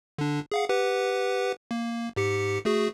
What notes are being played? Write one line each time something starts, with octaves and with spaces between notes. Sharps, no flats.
D3 D4
G#4 F5 F#5
G4 B4 F#5
A#3
G#2 G4 C#7
A3 F#4 G#4